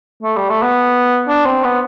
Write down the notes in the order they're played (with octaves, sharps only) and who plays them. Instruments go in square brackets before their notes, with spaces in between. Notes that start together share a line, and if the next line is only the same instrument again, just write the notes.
[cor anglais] A3
G3
A3
B3
D4
C4
B3